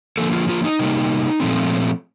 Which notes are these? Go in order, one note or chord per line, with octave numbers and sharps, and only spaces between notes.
D3 F3 A#3 A4
F4
F4
D#4
C3 G3 A#3
A#2 F3 A3 C4